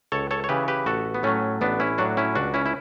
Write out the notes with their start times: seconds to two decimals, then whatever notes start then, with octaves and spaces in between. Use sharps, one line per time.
0.12 C#2 A4 C#5
0.31 A4 C#5
0.44 C#5
0.49 C#3 E3 G4 B4
0.68 G4 B4
0.86 A1 F#4 A4
1.14 B3
1.23 A2 F#3 A3 C#4
1.61 A1 B3 D4
1.80 C#4 E4
1.98 A2 F#3 D4 F#4
2.17 C#4 E4
2.35 C#2 D4 F#4
2.54 C#4 E4
2.66 E4